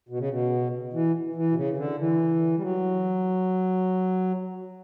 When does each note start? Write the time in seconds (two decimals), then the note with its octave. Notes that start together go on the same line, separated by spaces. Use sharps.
0.09 B2
0.19 C#3
0.29 B2
0.93 E3
1.36 E3
1.51 B2
1.56 C#3
1.73 C#3
1.77 D3
1.98 E3
2.58 G3
2.62 F#3